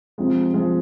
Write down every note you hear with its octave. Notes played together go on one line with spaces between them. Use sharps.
C3 F3 G#3
C3 F3 G#3